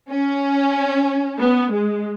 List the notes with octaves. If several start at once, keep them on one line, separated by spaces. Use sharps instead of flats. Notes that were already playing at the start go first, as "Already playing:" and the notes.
C#4
B3
G#3